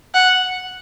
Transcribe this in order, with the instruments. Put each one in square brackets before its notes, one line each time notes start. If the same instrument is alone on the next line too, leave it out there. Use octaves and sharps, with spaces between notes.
[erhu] F#5